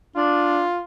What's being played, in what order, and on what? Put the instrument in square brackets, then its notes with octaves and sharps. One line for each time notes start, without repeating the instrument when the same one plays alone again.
[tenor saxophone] D4 [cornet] F4